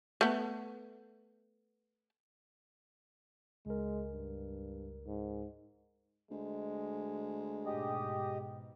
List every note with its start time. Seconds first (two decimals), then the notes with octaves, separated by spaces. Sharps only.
0.21 A3 B3
3.66 C#2 G#3 A#4
4.12 G2
5.06 G#2
6.31 D2 G#3
7.66 G#2 B2 G4 D#5